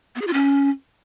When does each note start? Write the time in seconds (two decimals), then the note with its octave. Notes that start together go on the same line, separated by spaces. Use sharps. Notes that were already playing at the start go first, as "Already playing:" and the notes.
0.15 B3
0.21 G#4
0.27 F4
0.33 C#4